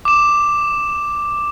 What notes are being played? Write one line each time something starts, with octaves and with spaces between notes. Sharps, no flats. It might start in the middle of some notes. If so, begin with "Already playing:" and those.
D6 E7